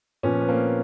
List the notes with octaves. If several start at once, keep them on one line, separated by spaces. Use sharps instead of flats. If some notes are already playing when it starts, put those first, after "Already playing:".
A#2 F3 B3 C#4
B3
A#3 C4